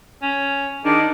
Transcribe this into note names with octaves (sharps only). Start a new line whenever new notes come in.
C#4
D#3 D4 G#4